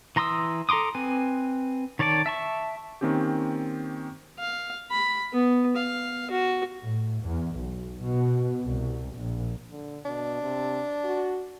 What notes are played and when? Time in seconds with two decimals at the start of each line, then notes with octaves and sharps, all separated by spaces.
0.16 E3 A#5 C6 D#6 E6
0.69 A4 A#5 C6 D6 D#6
0.95 C4 B4 G#5
1.99 D#3 C#5 D5 A5 D6
2.26 E5 A5 C#6
3.01 D#3 A#3 C4 C#4 G4
4.40 F5
4.91 B5
5.33 B3
5.76 F5
6.31 F#4
6.81 A2
7.21 E2
7.55 B1
8.03 B2
8.67 C2
9.18 A#1
9.71 D3
10.05 B2 D4
10.42 C3
11.04 F#4